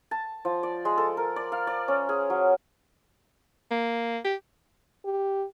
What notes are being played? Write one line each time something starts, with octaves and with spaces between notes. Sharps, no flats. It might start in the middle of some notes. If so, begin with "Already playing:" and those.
A5
F3
D5
G#3
A4
A#4
D5
F5
D5
C#4
G#4
F#3
A#3
G4
G4